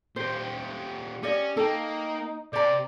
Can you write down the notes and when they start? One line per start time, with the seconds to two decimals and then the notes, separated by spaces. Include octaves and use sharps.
0.16 A#2 G4 C5
1.23 C#4 G4 D5 D#5
1.57 A#3 D#4 A4 G5
2.53 C3 C5 D5 A#5